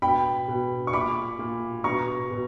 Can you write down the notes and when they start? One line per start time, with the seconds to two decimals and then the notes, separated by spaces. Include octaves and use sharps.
0.02 B2 G5 B5
0.48 B2
0.87 C#6
0.93 A#2 B5 D6
1.39 A#2
1.84 B2 A#5 C#6
2.31 B2